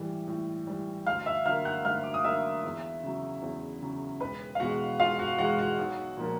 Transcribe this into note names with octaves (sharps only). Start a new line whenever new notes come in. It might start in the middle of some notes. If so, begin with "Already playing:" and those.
Already playing: A2 E3 G3
A2
E3 G3
D2 F5 F6
E5 E6
D3 F#3 A#3 F5 F6
F#5 F#6
D2 F5 F6
D6
D#6
D3 F#3 A#3 E5 E6
E2
C#3 F#3
E2
C#3 F#3
E1 B4 B5
F5
E2 B2 G#3 F#4 F#5
E1 F4 F5
F#4 F#5
E2 B2 G#3 F#4 F#5
F#4 F#5
B1
A#2 F3 A#3